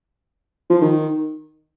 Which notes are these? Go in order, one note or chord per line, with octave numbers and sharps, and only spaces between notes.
F3
D#3